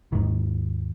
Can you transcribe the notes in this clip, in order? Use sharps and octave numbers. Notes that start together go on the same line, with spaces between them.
D#2 G#2 D#3